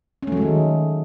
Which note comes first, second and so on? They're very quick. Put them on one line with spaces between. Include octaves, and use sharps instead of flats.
C#4 A3 F#3 G#3 D#3